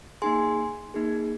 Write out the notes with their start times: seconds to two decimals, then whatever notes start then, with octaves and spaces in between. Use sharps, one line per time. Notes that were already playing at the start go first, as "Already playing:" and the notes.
0.22 A#3 D#4 G#4 G#5 C6
0.94 A#3 D#4 G#4